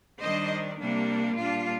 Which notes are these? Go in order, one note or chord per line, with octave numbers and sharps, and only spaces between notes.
D#3 G3 D4 C5 D#5
C3 G3 A#3 D4
A#2 G3 D4 F4